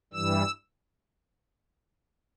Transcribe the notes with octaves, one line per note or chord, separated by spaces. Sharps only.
G2 E3 G3 E6